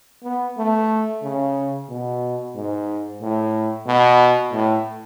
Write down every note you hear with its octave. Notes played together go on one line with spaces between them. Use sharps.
B3
A3
C#3
B2
G#2
A2
B2
A2